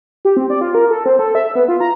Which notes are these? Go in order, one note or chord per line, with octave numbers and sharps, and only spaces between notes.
G4
C4
D5
F4
A#4
A4
C4
A4
E5
B3
F4
A#5